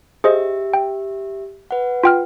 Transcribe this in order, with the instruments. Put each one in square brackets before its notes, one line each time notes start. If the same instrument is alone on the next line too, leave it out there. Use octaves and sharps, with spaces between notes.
[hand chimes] G4 E5 [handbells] G#4 C5 D#5
[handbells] G5
[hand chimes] B4 F#5
[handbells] F4 G5 F6